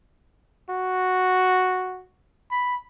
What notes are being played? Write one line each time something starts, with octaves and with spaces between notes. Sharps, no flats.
F#4
B5